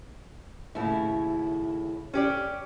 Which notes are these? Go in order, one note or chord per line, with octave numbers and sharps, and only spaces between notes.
D#2 A2 C#3 E4
C#4 G4 C5 D5